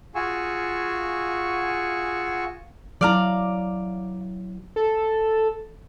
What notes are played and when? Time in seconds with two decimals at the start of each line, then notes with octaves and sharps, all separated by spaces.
0.15 F4 F#4 G#4 G#5 C#6 E6
3.01 F#3 E4 D5 F5 A#5
4.76 A4